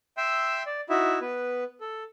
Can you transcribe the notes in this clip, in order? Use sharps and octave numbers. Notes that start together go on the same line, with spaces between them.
E5 G5 C6 E6
D5
D#4 E4 F#4 E5
B3 B4
A4